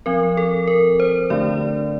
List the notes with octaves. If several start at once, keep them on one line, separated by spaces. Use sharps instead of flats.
F3 C4 A#4
A4
A#4
C5
D3 A3 D4 D5